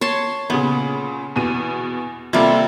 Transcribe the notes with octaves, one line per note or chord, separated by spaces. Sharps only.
C#5 A5 C6
A#2 C#3 B3
E2 B2 D#7
C3 G3 A#3 F4 A4